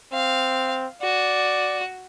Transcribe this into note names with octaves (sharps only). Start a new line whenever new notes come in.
C4 F5
F#4 D5